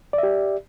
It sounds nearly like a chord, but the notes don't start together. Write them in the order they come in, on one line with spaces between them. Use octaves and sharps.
D5 E5 G4